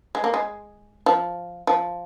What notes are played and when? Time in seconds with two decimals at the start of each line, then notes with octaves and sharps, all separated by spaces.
0.15 G#3
0.24 A#3
0.34 G#3
1.06 F3
1.67 F3